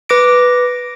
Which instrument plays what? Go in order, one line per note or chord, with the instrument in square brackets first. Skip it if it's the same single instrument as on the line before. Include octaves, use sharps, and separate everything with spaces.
[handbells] B4 D6 A#6 D7